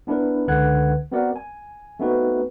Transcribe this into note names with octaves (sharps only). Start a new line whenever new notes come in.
B3 D4 E4 A#4 B4
C#2 D3 B4 F#5 F#6 G#6
B3 C4 F#4 A#4 D5 F#5
G#5
A3 B3 C4 D#4 F#4 B4